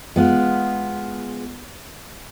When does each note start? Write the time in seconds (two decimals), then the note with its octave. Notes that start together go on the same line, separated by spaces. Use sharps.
0.16 G#3 B3 F4